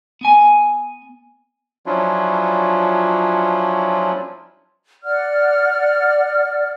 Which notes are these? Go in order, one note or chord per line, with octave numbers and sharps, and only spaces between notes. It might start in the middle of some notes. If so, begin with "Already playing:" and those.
B3 G#5
F3 F#3 C#4 D4 E4 F4
D5 F#5 F6